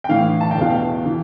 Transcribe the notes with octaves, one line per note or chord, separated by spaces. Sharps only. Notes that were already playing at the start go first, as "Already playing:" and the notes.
G5
A2 E3 F5
A5
G5
E2 B2 F5
G5
E3